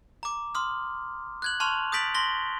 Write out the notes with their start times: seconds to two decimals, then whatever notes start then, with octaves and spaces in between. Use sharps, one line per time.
0.23 A#5 D6
0.55 C6 D#6 F6
1.42 F#6 G#6 F#7
1.60 A5 C6 C#6 F6 F7
1.92 D#6 G6 A6 B6 D7 F#7
2.14 C6 A#6 G7